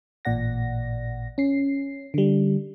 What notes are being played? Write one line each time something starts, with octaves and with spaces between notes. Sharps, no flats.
A1 A#2 D5 F#5 A#6
C#4 C7
D3 G3